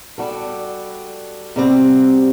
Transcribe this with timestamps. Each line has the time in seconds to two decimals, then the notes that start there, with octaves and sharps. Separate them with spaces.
0.18 G3 D4 F#4 A4
1.56 C3 G3 C4 F#4